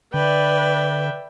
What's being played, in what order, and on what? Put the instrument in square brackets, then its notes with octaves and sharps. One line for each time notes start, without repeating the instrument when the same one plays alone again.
[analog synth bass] D3 [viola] B4 D5 [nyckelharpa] E5 G5